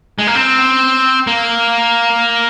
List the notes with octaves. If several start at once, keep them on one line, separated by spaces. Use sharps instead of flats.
G#3
A#3
C4
A#3